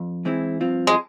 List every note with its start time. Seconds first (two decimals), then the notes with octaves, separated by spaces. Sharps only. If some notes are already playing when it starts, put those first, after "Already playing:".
Already playing: F2
0.25 E3 G#3 C4 E4
0.61 G2 F3 C4 F4
0.87 G#3